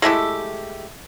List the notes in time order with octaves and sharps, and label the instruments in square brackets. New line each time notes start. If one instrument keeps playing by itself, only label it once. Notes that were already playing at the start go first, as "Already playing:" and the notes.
[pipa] G#3 A3 E4 G4